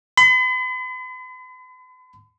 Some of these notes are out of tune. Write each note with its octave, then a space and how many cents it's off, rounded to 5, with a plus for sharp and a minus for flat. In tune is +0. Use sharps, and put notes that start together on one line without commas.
B5 +45